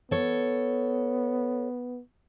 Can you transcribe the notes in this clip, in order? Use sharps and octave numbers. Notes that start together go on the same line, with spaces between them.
B3 A4 C#5